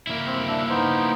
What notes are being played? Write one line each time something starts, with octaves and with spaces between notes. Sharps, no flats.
A#3 E4
C4
D4 E5
B3 D#4 C5